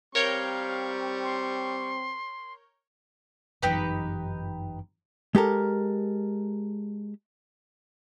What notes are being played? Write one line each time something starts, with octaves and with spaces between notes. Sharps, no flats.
G3 C4 A#4 C#5 F5 C#6 G6
C6
G1 F#2 E3 D#4 G4 B4
G#3 G4 A4 A#4